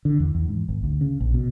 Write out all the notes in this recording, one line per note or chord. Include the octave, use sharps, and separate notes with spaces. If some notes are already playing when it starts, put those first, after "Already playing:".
D3
E2
E2
G#2
G#1
D2
C#3
A#1
B2